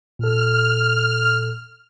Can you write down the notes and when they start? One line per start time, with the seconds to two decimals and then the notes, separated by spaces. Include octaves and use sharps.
0.19 A#2 A4 F6